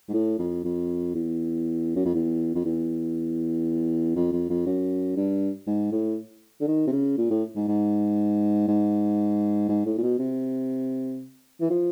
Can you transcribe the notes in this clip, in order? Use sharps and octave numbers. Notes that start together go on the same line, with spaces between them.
G#2
A2
F2
F2
E2
F#2
F2
E2
F2
E2
F2
F2
F2
F#2
G2
G#2
A2
D3
D#3
C3
C#3
A#2
A2
G#2
G#2
G#2
G#2
A2
A#2
B2
C3
E3
F3